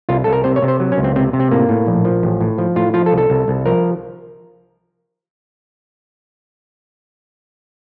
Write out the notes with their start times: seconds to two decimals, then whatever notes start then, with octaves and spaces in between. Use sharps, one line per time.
0.09 C2 F4
0.24 C2 A4
0.33 A#4
0.44 C3 C5
0.56 C#5
0.62 C3
0.68 C5
0.80 F#3
0.92 C#4
0.98 C#2
1.04 C4
1.16 C3 C4
1.33 C3
1.40 C4
1.51 A2 A#3
1.69 A2
1.87 A#1
2.05 F3
2.23 A1
2.41 A2
2.58 F3
2.76 A2 F4
2.94 F3 F4
3.06 A4
3.12 C2
3.18 A4
3.30 C2
3.48 C2
3.65 F3 A#4